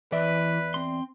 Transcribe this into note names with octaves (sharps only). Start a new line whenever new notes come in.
E2 E3 B4 D5 E5
C4 C6